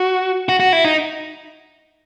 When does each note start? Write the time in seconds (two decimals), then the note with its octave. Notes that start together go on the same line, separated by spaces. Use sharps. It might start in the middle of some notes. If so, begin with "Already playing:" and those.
Already playing: F#4
0.49 F#4
0.60 F#4
0.73 E4
0.85 D#4